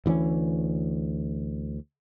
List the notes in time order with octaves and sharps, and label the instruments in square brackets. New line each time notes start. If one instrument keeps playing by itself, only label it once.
[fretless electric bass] D2 E3 A3 C#4